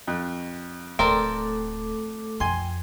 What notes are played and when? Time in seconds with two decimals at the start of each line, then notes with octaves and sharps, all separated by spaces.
0.07 F2 F#6
0.99 D1 A3 C4 A4 A#4 D5 D6
2.40 F2 G5 G#5 C6